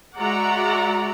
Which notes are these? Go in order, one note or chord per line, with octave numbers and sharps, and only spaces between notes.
G#3 F#4 D5 E5 F#5 A#5